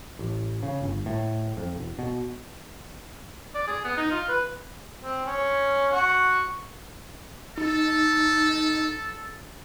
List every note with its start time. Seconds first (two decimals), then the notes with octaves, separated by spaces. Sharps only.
0.19 A1
0.63 C#3
0.82 G1
1.06 A2
1.57 F2
1.76 E1
1.99 B2
3.55 D5
3.68 G#4
3.85 B3
3.97 D#4
4.11 F4
4.28 B4
5.01 C4
5.26 C#4 C#5
5.91 F#4 F#5 C#6
7.58 D#4 A4